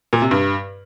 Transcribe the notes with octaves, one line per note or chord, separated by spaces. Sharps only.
A#2
C3
G2